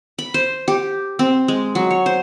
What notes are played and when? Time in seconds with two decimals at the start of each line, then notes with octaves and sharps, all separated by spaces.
0.19 B5
0.34 C5
0.68 G4
1.19 C4
1.48 G#3
1.75 F#3
1.91 C#5
2.06 C5